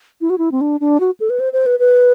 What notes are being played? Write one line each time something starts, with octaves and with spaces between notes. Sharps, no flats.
E4
F#4
E4
C4
D4
D4
F#4
A4
B4
C5
C5
B4
B4